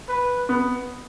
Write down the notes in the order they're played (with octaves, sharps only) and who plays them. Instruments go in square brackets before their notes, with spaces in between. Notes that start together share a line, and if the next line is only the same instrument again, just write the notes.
[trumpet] B4
[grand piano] B3